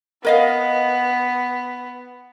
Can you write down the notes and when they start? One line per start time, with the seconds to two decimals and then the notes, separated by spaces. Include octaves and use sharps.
0.25 B3 A#4 D#5 F5